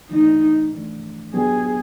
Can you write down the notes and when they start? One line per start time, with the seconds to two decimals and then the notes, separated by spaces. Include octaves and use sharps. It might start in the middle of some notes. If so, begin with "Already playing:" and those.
0.10 E3 A3 D4 D#4
0.72 E3 A3 D4
1.33 F#3 B3 D4 G4 G#4